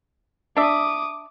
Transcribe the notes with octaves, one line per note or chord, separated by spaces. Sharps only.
D4 E5 D6 D#6